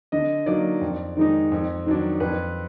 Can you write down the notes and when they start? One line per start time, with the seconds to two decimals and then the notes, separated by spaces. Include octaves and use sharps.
0.12 D3 D#5
0.46 F#3 A#3 D#4 D5
0.81 F2
1.17 D#3 G#3 D#4
1.51 F2
1.86 D#3 F#3 D4
2.20 F2 B4